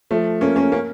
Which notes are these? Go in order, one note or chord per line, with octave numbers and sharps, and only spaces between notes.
F3 A3
A#3 C#4
A#3 C#4
A#3 C#4